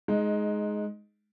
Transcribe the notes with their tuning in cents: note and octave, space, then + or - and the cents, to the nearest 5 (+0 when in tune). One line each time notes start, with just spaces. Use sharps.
G#3 +15 D#4 +0